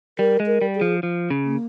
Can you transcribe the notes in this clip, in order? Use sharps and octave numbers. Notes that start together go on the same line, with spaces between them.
G3 A#4
G#3
A#4
G3
G#4
F3
F3
C#3
A#3